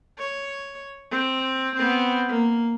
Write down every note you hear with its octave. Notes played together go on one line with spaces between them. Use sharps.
C#5
C4
B3 C4
A#3